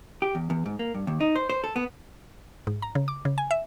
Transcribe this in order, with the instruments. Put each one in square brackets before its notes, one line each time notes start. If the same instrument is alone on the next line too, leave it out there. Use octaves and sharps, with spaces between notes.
[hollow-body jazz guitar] G4
E2
E2
G#2
A#3
G2
D#2
D#4
C5
C5
A4
B3
[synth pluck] G#2
A#5
C#3
D6
C#3
G#5
E5